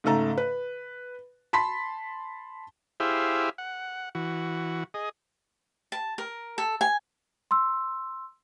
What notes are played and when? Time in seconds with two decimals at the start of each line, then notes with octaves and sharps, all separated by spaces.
0.04 G#2 C#3 A3 A4 A#5
0.37 B4
1.53 A5 B5 C6 B6
3.00 E4 G4 G#4 C5 E5 F5
3.58 F#5
4.15 E3 F#4
4.94 G#4 D#5
5.92 A5
6.18 A#4
6.58 A4
6.81 G#5
7.51 C6 E6